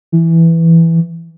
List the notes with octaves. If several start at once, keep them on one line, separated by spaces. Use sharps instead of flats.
E3